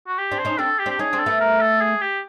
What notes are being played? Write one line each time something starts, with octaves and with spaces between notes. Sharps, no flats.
F#4
G4
C4 D4
C5
C#4 D#4
C4 D4 A4
G4
C4 D4
G4
C#4 D#4 G#4
C4 D4
A4
A3 B3
A#4
A4
G#4
G4